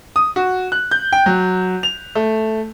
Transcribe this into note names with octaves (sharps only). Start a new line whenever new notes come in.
D#6
F#4
F#6
G6
G5
F#3
F7
A3